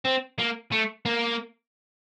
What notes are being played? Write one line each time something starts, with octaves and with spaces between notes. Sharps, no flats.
C4
A#3
A3
A#3